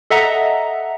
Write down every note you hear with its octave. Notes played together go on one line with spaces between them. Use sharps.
A4 D#5 E5 F#5 A#5